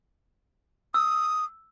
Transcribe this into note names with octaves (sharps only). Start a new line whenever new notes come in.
D#6 E6